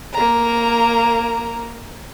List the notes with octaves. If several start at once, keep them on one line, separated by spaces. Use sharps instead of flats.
A#3 A#5